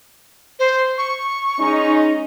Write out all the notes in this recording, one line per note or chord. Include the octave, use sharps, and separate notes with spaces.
C5
C#6
G#3 C#4 D#4